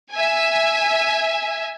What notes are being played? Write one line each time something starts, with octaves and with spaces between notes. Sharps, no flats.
E5 G#5